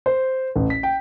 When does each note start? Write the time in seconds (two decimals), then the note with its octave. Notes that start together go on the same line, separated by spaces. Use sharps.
0.06 C5
0.56 A1
0.70 B6
0.83 G5